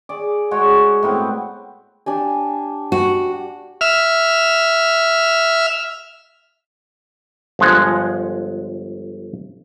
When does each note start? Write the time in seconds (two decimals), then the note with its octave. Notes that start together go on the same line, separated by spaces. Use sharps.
0.09 G#4 D5
0.51 G#3 F#4 C#5
1.03 A2 B3 C4
2.06 D4 G4 G#5
2.92 F#4
3.81 E5 F6
7.59 G1 F3 G#3 F#5